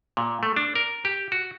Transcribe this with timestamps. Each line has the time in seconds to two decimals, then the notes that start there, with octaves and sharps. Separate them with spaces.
0.17 A#2
0.43 A3
0.56 D4
0.75 A#4
1.05 G4
1.32 F#4